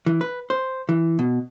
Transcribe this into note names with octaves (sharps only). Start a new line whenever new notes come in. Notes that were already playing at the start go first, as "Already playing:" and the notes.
E3
B4
C5
E3
B2